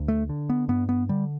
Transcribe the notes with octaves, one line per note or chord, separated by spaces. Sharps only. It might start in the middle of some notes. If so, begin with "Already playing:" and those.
Already playing: D2
A3
D3
B3
G2 B3
B3
D3 G3